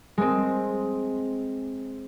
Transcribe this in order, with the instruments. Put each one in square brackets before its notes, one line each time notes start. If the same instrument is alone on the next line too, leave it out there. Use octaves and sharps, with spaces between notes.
[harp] G#3 C4